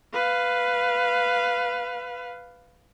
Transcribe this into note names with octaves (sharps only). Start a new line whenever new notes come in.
B4 F5